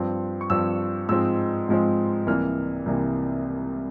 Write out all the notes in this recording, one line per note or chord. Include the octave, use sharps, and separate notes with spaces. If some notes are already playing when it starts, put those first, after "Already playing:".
Already playing: G2 F3 C4
C#6
G2 F3 C4 E6
G#2 F3 G#3 C4 E6
G#2 F3 G#3 C4
C2 C3 E3 A#3 F6
C2 C3 E3 A#3